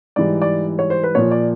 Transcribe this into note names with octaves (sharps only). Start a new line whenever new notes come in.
G#2 E3 G3 D5
D5
C#5
C5
B4
A#2 F3 C#5
D5